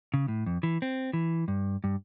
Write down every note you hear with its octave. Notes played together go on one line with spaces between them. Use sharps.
C#3
A2
F2
E3
C4
E3
G2
G2